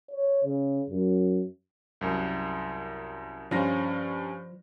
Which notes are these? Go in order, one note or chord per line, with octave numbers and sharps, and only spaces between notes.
C#5
C#3
F#2
C2 F#2
G2 F3 C#4 A#6